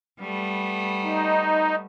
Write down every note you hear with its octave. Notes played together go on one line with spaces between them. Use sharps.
G3 A3 B3
D#4